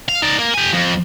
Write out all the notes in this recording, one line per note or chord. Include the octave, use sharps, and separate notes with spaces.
F5
D#4 D5
A#3
G4 G#5
F2